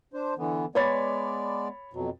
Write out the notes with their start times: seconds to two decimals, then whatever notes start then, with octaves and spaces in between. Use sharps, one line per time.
0.13 D4 C5
0.38 D3 E3 B3
0.75 G#3 B3 C#5 D5 B5 A6
1.93 F2 B2 F#3